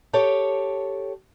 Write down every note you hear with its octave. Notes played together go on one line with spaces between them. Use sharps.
G4 A4 C#5 G5